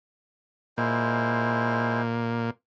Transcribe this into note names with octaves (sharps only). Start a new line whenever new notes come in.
A#2 G#3 E4 C5